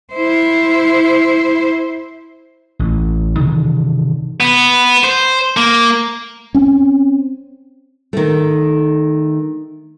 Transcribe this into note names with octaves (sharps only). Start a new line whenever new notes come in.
E4 C5
A1
C3 D#3 E3
B3
C5
A#3
C4 C#4
D#3 A3